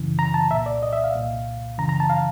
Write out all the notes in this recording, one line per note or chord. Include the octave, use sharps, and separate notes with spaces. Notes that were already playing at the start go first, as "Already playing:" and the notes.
Already playing: F#2 C#3 E3
A#5
A5
C2 A#2 E5
D5
D#5
E5
F5
C2 A#2
F#2 C#3 E3 A#5
A#5
A5
F5